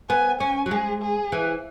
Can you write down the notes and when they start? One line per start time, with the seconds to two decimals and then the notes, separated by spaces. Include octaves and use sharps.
0.09 B3 G#5
0.40 C#4 G#5
0.66 F#3
0.71 G#3 G#4
1.02 G#4
1.32 E3